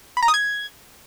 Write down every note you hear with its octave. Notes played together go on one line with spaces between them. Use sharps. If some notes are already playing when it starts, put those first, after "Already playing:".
B5
A#5
D#6
G#6